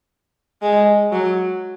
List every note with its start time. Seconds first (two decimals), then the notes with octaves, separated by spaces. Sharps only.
0.62 G#3
1.12 F#3